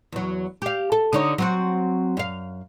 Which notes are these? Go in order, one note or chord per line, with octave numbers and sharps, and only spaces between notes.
E2 F#3
G4 F5
A4
D3 D#4 C#5
F#3 C4 F#4
F#2 F5